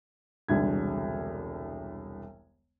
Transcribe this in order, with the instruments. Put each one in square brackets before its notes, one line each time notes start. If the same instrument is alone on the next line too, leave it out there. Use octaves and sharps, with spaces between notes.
[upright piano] E1 C2 D3 G#6